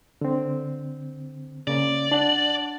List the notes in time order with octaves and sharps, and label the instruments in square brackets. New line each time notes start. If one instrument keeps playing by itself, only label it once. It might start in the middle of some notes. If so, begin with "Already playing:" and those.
[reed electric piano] D3 C4
[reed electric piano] C#3 A#3 [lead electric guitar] D5
[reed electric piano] D4 F#5 A5